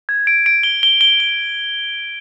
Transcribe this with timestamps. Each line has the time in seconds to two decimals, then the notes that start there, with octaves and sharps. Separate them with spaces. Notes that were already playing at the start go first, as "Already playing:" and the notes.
0.09 G#6
0.27 D7
0.46 D7
0.63 G7
0.83 G7
1.01 G7
1.20 G7